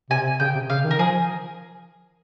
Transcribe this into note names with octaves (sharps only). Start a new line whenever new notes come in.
C3 G#5
C#3 G5
C3
C#3 F5
D#3
A#4
F3 G#4